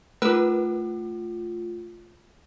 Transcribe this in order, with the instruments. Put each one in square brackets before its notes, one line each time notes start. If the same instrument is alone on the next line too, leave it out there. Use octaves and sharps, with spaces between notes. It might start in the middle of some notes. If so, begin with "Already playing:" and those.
[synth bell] A3 F4 [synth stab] A#4 B4 E6